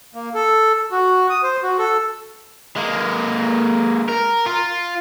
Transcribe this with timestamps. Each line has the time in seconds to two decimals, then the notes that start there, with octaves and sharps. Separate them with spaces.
0.15 A#3
0.34 A4
0.91 F#4
1.30 D#6
1.43 C5
1.63 F#4
1.79 A4
2.77 G#3 A#3
4.09 A#4
4.46 F4